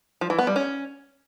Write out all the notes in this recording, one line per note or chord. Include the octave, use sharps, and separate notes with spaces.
F3
E3
B3
G3
C#4